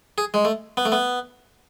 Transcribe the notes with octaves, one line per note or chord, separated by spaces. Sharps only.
G#4
G#3
A3
B3
A3
B3